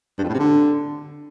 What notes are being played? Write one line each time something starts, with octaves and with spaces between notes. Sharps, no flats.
G2
F2
A2
C3
D3